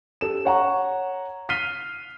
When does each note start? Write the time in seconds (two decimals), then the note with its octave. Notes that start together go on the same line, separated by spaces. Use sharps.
0.21 G4 A4 E7
0.45 C#5 F#5 A#5 C#6
1.49 F6 B6 C7 D#7 G7